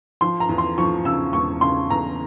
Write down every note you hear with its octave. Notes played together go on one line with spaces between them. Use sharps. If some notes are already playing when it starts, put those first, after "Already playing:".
F3 C6
A#5
E2
C6
F3 C#6
C#3 E6
E1 C#6
C#3 C6
E2 A#5